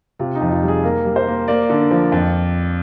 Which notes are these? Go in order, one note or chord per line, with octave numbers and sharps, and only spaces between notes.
C3 F4
D#4
F2
F4
G3
G#4
A#3 A#4
G3
C5
A#3
A#3 D5
D3
F3
F2